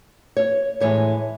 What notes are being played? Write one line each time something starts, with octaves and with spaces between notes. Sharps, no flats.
C#5
A2 E3 G#3 C#5